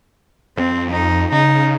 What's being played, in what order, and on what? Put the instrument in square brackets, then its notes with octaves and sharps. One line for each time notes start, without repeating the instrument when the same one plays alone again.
[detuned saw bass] F2 [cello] C4
[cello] D#4
[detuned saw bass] C#3 [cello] D#4